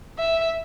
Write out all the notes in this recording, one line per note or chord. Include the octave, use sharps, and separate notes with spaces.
E5